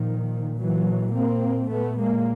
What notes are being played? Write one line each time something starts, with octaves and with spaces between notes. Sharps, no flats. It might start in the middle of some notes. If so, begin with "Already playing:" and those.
Already playing: A#2 D#3 F3
E3 F#3
A#3 C4
A#2 A3 B3
G#3 A#3